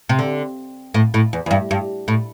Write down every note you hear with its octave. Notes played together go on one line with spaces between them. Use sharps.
C3
D3
A2
A2
E2
E2
G2
G2
A2